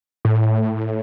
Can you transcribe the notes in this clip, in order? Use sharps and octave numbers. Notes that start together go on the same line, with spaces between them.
A2